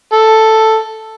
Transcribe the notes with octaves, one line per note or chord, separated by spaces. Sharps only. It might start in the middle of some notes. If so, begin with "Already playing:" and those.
A4